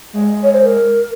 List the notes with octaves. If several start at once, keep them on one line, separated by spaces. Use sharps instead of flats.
G#3
C#5
C5
A#4